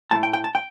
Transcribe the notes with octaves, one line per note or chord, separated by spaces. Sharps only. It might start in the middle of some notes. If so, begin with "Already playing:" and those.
A2 A3 A5
G5
G5
A5
G5